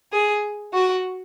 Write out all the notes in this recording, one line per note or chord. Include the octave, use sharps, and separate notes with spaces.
G#4
F#4